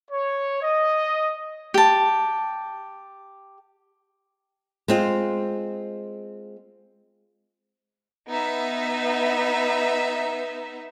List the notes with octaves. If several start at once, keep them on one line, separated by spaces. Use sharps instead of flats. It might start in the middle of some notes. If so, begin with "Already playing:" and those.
C#5
D#5
G4 A5
G#3 C4 F4
B3 D#4 E5